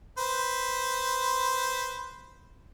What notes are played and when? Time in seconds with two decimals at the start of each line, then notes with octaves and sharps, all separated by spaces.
0.18 B4 C5